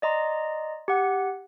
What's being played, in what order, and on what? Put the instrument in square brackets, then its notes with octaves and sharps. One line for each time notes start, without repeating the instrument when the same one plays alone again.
[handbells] D5 D#5 A#5 C6
G4 F#5